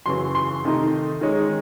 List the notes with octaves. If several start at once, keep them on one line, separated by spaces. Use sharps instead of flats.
F#2 C#3 E3 C6
C6
C3 D#3 A3 D#4
D#3 G#3 C#4